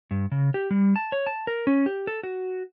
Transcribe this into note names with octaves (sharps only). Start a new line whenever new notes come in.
G2
C#3
G4
G3
A5
C#5
A5
A#4
C#4
G4
A4
F#4